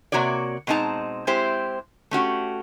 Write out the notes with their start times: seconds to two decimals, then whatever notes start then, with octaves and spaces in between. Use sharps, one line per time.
0.12 C3 A#3 F#4 C#5 D5
0.67 B2 G#3 C4 D#4 A5 A#5
1.27 G#3 C4 E4 G4 C5
2.11 A3 C#4 F#4 G4